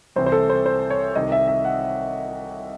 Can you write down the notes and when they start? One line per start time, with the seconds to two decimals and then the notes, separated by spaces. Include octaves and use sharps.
0.16 C2 C3 E3 C5
0.26 C5
0.32 A4
0.50 C5
0.66 C5
0.90 C#5
1.15 C2 C3 D#3 D#5
1.32 E5
1.48 E5
1.65 F#5